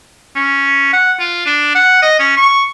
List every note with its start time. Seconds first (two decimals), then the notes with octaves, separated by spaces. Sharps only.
0.36 C#4
0.93 F#5
1.19 F4
1.46 D4
1.75 F#5
2.02 D#5
2.19 C#4
2.37 C#6